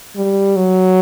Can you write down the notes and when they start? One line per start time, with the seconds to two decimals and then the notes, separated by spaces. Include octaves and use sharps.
0.16 G3
0.56 F#3